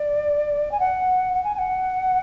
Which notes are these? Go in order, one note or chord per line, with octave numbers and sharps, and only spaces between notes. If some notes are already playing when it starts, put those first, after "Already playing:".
Already playing: D5
G#5
F#5
F#5
G#5
G#5
F#5